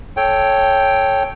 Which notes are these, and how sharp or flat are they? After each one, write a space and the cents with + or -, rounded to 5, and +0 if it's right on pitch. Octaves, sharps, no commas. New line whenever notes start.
A4 -10 C#5 +0 G5 +0